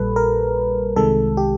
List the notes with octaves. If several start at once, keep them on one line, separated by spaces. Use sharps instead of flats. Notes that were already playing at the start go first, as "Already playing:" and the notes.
Already playing: A#1 A#2 G3 A4 B4
A#4
C2 C3 D#3 G#3 A4
G4